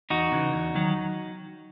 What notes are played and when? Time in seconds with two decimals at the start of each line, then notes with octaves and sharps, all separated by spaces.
0.10 E2 D#4 F#4
0.32 C#3 E3
0.54 E2
0.75 D#3 F#3